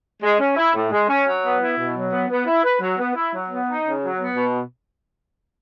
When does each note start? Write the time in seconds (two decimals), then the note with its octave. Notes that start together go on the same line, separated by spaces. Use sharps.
0.22 G#3
0.39 C#4
0.57 E4
0.74 A2
0.91 G#3
1.08 C#4
1.25 F#3
1.43 B3
1.59 E4
1.77 B2
1.94 F#3
2.11 B3
2.28 B3
2.46 E4
2.63 B4
2.80 F#3
2.97 B3
3.14 E4
3.32 F#3
3.49 B3
3.66 D#4
3.83 C#3
4.00 F#3
4.18 B3
4.35 B2